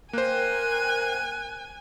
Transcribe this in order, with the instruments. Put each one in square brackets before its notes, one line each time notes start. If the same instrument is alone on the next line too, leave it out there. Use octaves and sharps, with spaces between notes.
[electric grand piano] A#3 C5 [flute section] A#4 G5 [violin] G#5 [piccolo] F#6